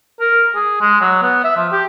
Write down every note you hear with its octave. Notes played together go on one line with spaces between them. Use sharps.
A#4
G#4
G#3
F#3
B3
E5
F3
G4